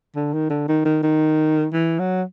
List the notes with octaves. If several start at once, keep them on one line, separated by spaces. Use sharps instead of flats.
D3
D#3
D3
D#3
D#3
D#3
E3
F#3